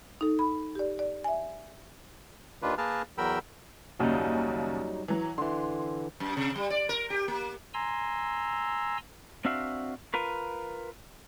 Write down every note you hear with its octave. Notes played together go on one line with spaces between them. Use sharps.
D#4 A4
B5
G4 D5
D5
E5 G#5
D#2 D#3 D4 F4 B4
A#3 G#4 A#4 B4 A5 F6
E2 F#3 A#4 G5 B5 E6
F#1 D#2 C#3 F#3 G3 D#4
E3 F#3
D3 E3 C6
F#2
C3
G3
D5
A#4
G4
A#3
G#5 A#5 C6 E6
C4 D4 F#4 E5 F5
F4 A#4 B4